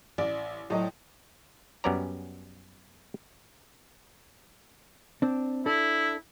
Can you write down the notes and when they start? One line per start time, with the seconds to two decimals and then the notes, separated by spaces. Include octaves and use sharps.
0.18 A1 D5
0.70 A2 F3 F#3 D#5 G5
1.84 F#2 G3 B3 C#4 D5 A#5
5.22 C4 D4
5.66 D4 E4 A4